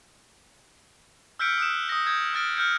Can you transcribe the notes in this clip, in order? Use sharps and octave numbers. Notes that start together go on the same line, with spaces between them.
E6 F6 G6 B6 C#7 D7
D#6 E6 F#6 E7
D#6 A#6
D#6 G6 G#6
D#6 F6 A6 D7
F6 G6 C#7